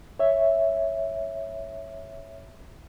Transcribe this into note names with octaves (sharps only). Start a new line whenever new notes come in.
C#5 E5